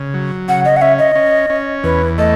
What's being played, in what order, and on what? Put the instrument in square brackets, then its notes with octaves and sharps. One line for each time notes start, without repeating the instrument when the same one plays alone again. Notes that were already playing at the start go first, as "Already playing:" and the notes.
Already playing: [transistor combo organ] C#3
F#3
[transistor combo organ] C#3 [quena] F#5
[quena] D#5
F#5
[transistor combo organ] C#4 [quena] E5
[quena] D#5
[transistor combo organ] C#4
C#4
[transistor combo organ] E2 [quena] B4
[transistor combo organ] A3 [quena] D#5